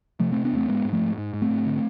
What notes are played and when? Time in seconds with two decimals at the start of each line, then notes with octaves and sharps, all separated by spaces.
0.20 C3 F3 A3
0.32 A3 C4
0.37 C3
0.44 B3 D4
0.52 E2 A3 C4
0.68 G#2 G#3 B3
0.85 G#2
0.92 F3 A3
1.01 G#2
1.18 G#2
1.34 G#2
1.42 A3 C4
1.50 G#2
1.66 D3